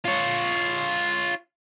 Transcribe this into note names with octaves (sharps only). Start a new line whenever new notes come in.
F4 C#5